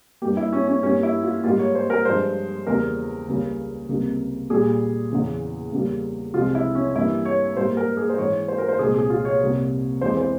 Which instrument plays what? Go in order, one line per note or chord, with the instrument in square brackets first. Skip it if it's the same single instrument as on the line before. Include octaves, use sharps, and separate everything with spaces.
[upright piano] G2 G3 A#3 G4
E4
C#4
C#4
G2 G3 A#3 C#4
E4
F4
G#2 G3 A#3 F4
C#5
C5
A#4
G2 F3 G#3 C5
E2 C#3 G3 A#3 A#4
C#2 C#3 G3 A#3
C#2 C3 G3 A#3
A#2 G3 A#3 G#4
E2 C#3 E3
E2 C#3 G3 A#3
C2 C3 F3 G#3 F4
E4
C#4
G2 E3 A#3 E4
C#5
G#2 G3 A#3 C5
A#4
G#4
C5
G#2 E3 G#3 C#5
C5
A#4
C5
C2 A#2 G#3 G#4
G#4
F4
C#5
C2 C3 G3 A#3
E2 C3 E3 G#3 C5
C5